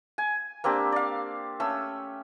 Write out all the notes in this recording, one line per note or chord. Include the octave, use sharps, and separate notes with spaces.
G#5
A#3 C4 D4 G4
D5 F5
A3 C#4 E6